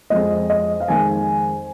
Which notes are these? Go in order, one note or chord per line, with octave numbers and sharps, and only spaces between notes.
F2 F3 G#3 D#5
D#5
F5
F2 D#3 G#3 G#5